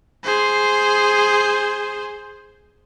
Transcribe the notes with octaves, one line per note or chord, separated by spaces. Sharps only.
G#4 C5